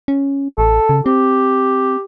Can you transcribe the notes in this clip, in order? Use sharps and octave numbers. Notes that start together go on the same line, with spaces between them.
C#4
A1 A4
C#3
C4 G4